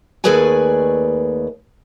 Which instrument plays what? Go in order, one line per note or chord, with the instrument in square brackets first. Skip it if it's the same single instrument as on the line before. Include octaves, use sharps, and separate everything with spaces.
[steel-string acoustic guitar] D#2 A3 G#4 B4 D5 G#5